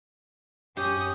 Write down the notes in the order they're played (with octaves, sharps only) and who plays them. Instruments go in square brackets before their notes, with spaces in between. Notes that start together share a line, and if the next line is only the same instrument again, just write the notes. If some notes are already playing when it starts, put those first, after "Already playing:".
[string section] F#2 C#4 D#6 [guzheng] G4